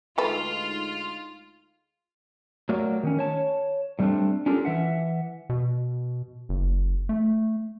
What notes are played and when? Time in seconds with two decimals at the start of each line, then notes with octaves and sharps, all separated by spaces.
0.18 D2 G#3 D#4 F4 A4 B4
2.69 F#3 A3 A#3 F#4 D5
3.03 D#3 B3 C#4
3.19 C#5 A5
3.99 A2 G3 A3 C4 D4
4.46 C#4 D4 F4 G4 A4 A#4
4.65 E3 E5 F#5
5.49 B2
6.49 F#1
7.09 A3